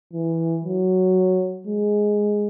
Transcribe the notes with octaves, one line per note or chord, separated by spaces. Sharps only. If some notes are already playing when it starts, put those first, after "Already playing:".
E3
F#3
G#3